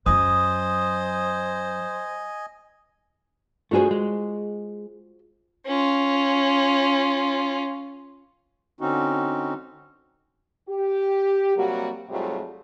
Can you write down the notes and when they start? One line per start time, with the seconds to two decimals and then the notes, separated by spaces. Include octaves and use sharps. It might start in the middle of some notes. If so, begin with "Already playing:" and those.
0.06 F#2 F#3 C5 D#5 G#5 D#6
3.71 A3 D4 F4 F#4 G#4 C5
3.91 G#3
5.67 C#4 F4
8.81 D3 C4 C#4 D#4 F#4
10.68 G4
11.56 C3 F#3 G3 A#3 F#4
12.09 G#2 C3 F#3 G3 A3 F4